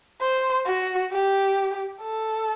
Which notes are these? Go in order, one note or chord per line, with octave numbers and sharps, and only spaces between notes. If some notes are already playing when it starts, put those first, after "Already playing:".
C5
F#4
G4
A4